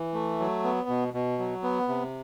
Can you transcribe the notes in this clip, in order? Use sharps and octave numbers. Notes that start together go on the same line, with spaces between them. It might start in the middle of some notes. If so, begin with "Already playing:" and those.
Already playing: E3
A3
F#3
B3
B2
B2
F#3
B3
C3